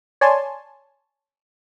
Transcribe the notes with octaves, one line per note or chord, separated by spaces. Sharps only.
C#5 D5 G#5 A5 C6